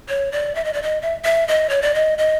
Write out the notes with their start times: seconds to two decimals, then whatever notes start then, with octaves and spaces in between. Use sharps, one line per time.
0.09 C#5
0.32 D5
0.55 E5
0.65 D#5
0.73 D5
0.83 D#5
1.02 E5
1.25 E5
1.48 D#5
1.70 C#5
1.82 D5
1.95 D#5
2.18 D#5